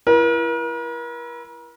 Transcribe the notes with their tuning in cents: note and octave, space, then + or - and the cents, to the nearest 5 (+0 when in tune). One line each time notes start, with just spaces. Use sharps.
E4 +30 A#4 +45